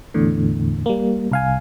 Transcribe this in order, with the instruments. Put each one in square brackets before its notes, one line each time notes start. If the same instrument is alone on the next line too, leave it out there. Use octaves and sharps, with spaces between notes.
[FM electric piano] E2 A2 D3
G3 A#3
C2 F5 G#5